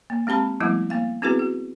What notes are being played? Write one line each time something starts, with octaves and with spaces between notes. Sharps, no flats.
A#3
G#3 C4 G4 A5 B5
F3 G3 A3 B3 E4
A#3 F5
B3 C4 E4 F#4 G#4 B4
F#4